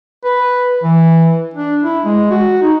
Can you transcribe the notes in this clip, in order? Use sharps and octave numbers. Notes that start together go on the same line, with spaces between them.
B4
E3
D4
E4
G#3
F#4
D#4